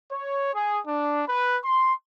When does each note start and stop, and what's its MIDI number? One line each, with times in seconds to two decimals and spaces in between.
0.12 0.53 73
0.55 0.81 68
0.87 1.23 62
1.29 1.57 71
1.65 1.94 84